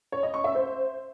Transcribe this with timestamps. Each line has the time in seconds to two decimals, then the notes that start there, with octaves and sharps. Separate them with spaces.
0.12 C#5
0.23 D#5
0.34 C#6
0.44 E5
0.55 C5